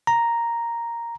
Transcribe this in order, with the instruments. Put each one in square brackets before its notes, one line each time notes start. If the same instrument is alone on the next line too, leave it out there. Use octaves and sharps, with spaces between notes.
[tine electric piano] A#5